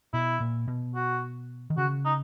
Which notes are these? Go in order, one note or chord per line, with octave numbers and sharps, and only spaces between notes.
B2 E4
A#2
B2
F#4
D#3
C#3 F#4
D#4